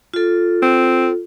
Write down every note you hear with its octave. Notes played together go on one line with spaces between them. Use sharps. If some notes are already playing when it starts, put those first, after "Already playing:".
F4 A4
C4